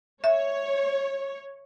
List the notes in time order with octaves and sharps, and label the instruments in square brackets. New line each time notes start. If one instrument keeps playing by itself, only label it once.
[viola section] C#5 [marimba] E5